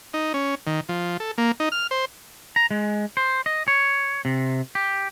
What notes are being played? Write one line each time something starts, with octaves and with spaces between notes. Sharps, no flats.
D#4
C#4
D#3
F3
A4
A#3
D#4
F6
C5
A#5
G#3
C5
D#5
C#5
C3
G4